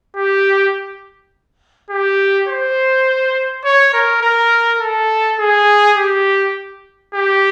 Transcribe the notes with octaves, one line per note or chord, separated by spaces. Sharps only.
G4
G4
C5
C#5
A#4
A#4
A4
G#4
G4
G4